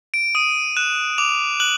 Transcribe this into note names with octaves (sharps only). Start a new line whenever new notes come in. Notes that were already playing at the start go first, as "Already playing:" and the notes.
D7
D#6 D#7
F#6 E7
D6 F7
F#6 F#7